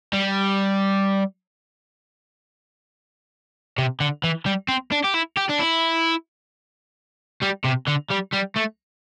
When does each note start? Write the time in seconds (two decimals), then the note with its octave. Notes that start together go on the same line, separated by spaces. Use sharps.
0.13 G3
3.78 C3
4.00 D3
4.24 E3
4.46 G3
4.68 C4
4.92 D4
5.04 G4
5.14 E4
5.37 G4
5.50 D4
5.60 E4
7.42 G3
7.65 C3
7.88 D3
8.11 G3
8.33 G3
8.56 A3